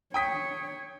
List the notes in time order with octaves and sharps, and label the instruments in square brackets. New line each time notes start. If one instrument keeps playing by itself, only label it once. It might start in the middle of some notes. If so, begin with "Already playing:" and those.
[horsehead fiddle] C#5 [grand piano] G5 D#6 B6